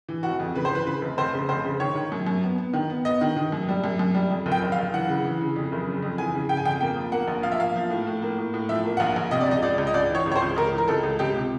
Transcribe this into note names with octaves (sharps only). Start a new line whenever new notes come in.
E3
F1 F#4
F2
C#3 B4
C5
E3 B4
C#3 B4
F1
F1 C5
C#3
F1 C5
C#3
D#3 C#5
D#3
F#2
F#2
B3
B3
D#3
B3
B3 D#5
D#3
D#3
F#2
G3
F#2
F#2
G3
F2
F#1
G5
F#1
F5
F#1
E3 F#5
C#3
E3
C#3
F2
F#1
C#3
F2
E3 G#5
C#3
C#3 G5
G#5
F2 G5
A#3 G5
F3
A#3 F#5
A#1
F3 F5
E5
A#3 F5
F3
A2
A2
A#3
A2
A2
F3 E5
A#3
F#5
A#1 F5
A#1
C3 D#5
D5
C#2 D#5
C#2 D5
C#2
D#5
C#2 D5
E3 C#5
C#2
C#5
C5
C#2
C#2 A#4
E3 A#4
C#2 A4
C#2
C#2 G4
C3